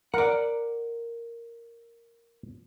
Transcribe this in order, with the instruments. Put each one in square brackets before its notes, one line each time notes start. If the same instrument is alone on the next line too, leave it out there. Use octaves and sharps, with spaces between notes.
[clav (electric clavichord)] A#4 [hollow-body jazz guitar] D5 F#5